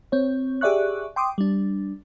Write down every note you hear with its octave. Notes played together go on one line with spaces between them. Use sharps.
C4 C#5
G4 G#4 D5 E5 C#6 F#6
G5 C6 D6 D#6
G3 D4